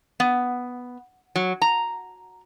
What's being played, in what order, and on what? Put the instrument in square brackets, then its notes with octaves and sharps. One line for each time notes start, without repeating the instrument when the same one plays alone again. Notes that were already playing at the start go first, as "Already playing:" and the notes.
[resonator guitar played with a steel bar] B3
F#3
A#5